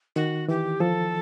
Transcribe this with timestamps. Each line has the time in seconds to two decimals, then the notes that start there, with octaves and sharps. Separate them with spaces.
0.16 D#3 F#4
0.48 E3 G4
0.80 F3 A4